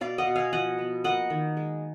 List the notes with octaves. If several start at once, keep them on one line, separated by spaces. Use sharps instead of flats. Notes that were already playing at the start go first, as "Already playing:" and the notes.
B2 D5 F5
D#5 F#5
B2
F5 G#5
F3 D#5 F#5
B3
A#3 D#5 F#5
D#3
G#3